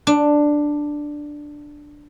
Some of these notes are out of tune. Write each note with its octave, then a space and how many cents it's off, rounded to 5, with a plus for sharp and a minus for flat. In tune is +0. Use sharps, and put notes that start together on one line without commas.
D4 +5